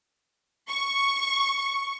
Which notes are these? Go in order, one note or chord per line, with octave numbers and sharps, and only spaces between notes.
C#6